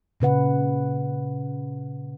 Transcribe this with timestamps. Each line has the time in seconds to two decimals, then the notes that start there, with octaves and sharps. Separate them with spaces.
0.20 A#2 C#3 B4 F#5